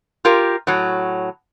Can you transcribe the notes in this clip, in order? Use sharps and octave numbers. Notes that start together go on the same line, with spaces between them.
F4 G4 A#4
A2 F#3